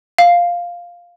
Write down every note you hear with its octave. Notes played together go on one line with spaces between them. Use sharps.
F5